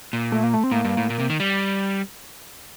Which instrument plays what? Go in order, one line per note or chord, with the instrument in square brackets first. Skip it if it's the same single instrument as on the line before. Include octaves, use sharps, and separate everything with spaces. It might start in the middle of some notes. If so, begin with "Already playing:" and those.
[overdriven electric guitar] A#2
[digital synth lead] A3
A#3
A3
C4
[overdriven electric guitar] A2 [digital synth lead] A#3
[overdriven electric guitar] G2
A2
A#2
C3
D#3
G3